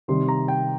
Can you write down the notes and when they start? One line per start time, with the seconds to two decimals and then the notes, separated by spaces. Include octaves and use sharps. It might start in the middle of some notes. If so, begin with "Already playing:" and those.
0.08 C3 D#3 G3 C6
0.28 A#5
0.48 G5